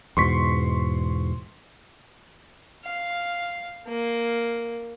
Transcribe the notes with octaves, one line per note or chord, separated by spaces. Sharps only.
E2 G#2 B2 C6 C#6 B6
F5
A#3